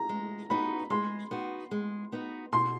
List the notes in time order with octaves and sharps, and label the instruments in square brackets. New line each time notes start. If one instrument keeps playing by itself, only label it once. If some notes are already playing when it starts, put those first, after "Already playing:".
Already playing: [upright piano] A#5
[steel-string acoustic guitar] G#3
[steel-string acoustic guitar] B3 D#4 F#4 [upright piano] B5
[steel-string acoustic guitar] G#3 [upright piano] C6
[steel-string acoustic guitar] B3 D#4 F#4
G#3
B3 D#4 F#4
[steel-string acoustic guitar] B2 [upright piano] C6